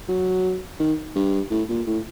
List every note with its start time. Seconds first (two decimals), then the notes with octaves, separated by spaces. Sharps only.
0.09 F#3
0.80 D#3
1.16 G2
1.51 A2
1.69 A#2
1.87 A2